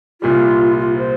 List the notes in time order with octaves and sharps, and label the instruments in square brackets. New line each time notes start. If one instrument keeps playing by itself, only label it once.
[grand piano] C2 A#2 G3 [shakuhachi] F4
[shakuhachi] F4
C5